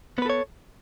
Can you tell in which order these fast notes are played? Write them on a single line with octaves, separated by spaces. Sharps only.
B3 B4 A4 C#5